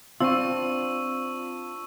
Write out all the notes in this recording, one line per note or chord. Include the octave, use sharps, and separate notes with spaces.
C4 D4 F4 C#6 E6